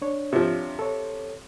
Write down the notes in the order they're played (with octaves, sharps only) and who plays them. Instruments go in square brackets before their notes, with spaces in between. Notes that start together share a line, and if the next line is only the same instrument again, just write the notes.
[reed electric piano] D4 C#5
[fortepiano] C3 F3
[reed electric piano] A4 C#5